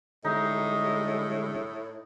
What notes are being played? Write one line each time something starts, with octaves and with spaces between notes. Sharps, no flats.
A2 D3 G3 G#3 D#4 D#5